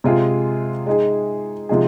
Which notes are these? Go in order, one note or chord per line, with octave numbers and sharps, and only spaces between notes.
C3 G#3 F4 G#4
G#3 D#4 G#4
C3 F3 G#3 D#4 G#4